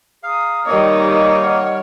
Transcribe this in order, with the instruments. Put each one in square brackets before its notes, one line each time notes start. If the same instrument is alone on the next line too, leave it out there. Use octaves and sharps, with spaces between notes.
[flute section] G#4 A#5 D#6 [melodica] F5
[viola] D#3 D#4 [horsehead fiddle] G3 C#5 [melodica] A#3
[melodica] A#3 [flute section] G4 G#4 A#5
[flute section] D#5 F#5 F6